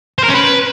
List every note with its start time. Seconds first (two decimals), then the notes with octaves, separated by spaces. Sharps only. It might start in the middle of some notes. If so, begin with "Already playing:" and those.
0.18 C5
0.24 A#4
0.29 C#4
0.34 B4